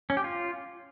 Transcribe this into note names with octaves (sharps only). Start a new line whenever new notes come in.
C#4
G4
F4